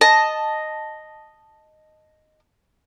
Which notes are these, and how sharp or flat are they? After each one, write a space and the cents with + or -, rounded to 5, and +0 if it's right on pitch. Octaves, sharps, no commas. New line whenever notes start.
D#5 -5 A5 +0